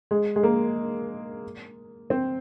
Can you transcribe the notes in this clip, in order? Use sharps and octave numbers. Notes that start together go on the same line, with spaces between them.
G#3
G#3
A#3
C4